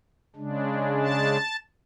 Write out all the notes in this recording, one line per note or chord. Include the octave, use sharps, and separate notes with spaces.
C#3 G#3 D4
A5